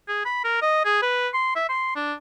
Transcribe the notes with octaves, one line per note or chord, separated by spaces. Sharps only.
G#4
B5
A#4
D#5
G#4
B4
C6
E5
C6
D4